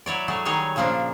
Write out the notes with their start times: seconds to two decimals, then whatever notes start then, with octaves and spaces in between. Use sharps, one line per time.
0.06 F#3 E4 C#5 D5
0.28 F#3 A3 G#4
0.45 D#3 F#3 G3 D#4 G#4 C#5
0.76 A#2 C#3 F3 A#3 D4